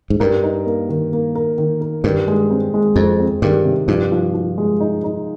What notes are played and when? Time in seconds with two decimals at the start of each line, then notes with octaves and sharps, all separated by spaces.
0.10 G#2
0.20 G2 A#4
0.43 D#4
0.66 A#3
0.89 D#3
1.13 A#3
1.35 A#4
1.58 D#3
1.81 A#4
2.04 G2 D#3
2.28 G#3
2.51 C4
2.74 G#3
2.96 F2 G#3
3.20 C4
3.42 G2 D#3
3.65 C3
3.88 G2 F3
4.12 F3
4.34 F3
4.58 G#3
4.80 D#4
5.04 D#4